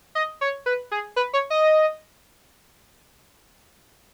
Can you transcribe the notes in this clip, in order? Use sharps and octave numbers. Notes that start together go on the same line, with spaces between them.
D#5
C#5
B4
G#4
B4
C#5
D#5